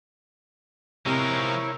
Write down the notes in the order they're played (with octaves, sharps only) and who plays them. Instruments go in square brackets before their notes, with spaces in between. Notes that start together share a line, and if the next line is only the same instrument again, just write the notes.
[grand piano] C3 [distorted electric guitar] F3 G#3 [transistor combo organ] E4 C#5 [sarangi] A#4